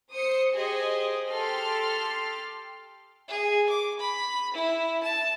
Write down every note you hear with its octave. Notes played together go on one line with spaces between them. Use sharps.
C5 D#6 C#7
G4 G#4 C5 D#5
G4 A4 C6 F6
G#4
D6
B5
E4
A5